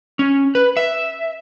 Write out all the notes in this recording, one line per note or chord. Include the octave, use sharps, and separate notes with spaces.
C#4
B4
E5